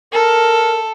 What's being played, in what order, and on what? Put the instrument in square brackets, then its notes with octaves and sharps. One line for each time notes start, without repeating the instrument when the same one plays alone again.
[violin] A4 [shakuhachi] A#4